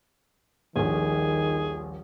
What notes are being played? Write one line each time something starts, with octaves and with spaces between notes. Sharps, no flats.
D#1 A#1 D#3 G#4